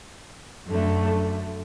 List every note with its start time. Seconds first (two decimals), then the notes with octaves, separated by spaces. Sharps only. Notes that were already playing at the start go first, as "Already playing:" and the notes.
0.68 F#2 D3 A3